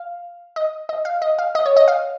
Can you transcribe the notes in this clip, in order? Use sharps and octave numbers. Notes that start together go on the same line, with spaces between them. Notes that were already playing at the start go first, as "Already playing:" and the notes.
Already playing: F5
D#5
D#5
F5
D#5
F5
D#5
C#5
D#5
F5